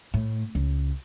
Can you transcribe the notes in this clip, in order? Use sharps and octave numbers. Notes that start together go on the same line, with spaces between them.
A2
C#2